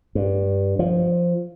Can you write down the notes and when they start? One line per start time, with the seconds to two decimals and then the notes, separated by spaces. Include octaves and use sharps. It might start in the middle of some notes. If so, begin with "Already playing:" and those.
0.15 G2
0.79 F3